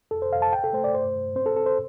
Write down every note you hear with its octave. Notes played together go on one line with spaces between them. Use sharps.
F2 A4
C5
F2 F5
A5
C2 G5
A4
A3 C5
D5
G2 C5
G2
C4 C5
A4
C4 A4
C5